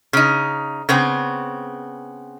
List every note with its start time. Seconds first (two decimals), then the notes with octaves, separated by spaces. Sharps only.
0.13 C#3 D#4
0.89 C#3 B3 C4